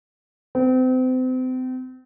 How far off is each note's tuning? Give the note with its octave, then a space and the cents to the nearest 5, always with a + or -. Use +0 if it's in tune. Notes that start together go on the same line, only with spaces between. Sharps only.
C4 -35